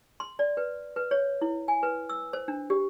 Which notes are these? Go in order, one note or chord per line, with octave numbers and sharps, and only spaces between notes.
C6
D5
B4
B4
C#5
E4
G#5
B4
E6
C5
D4
G4